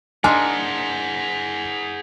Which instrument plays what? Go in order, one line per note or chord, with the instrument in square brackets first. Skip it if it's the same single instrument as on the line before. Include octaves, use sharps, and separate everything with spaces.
[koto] A#3 D4 D#4 [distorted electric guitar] G#4 F#5 [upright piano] G#5 C6